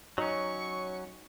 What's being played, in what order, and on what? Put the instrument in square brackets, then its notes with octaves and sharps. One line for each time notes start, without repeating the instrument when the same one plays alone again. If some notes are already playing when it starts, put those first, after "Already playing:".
[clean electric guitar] F#3 C#4 [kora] D#4 [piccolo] C#6